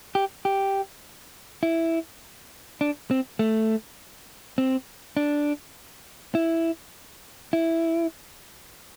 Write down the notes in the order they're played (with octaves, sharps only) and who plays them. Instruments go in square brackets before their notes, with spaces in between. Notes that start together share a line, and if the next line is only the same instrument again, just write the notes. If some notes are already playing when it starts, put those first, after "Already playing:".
[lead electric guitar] G4
G4
E4
D4
C4
A3
C4
D4
E4
E4